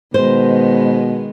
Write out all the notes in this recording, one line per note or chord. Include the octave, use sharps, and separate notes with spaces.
B2 D#3 G#3 B3 C5